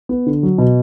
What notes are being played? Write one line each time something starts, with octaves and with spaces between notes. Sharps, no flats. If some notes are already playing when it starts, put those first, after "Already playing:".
B3
D3
F#3
B2